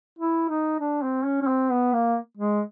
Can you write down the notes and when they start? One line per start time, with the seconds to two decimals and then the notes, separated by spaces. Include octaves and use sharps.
0.19 E4
0.49 D#4
0.80 D4
1.02 C4
1.25 C#4
1.42 C#4
1.47 C4
1.70 B3
1.93 A#3
2.37 G#3